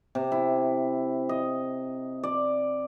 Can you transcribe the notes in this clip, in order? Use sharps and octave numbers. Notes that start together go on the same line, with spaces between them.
C3
E4
D#5
D5